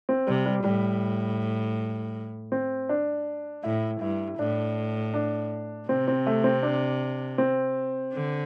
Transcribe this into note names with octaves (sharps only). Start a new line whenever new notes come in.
C4
C3 G3
G3
A2 G3
C4
D4
A2 E4
G2 E4
A2 D4
D4
C3 C4
C4
A3
C4
D4
C4
D3